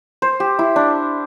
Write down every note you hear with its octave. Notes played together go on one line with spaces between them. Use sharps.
C5
G4
E4
D4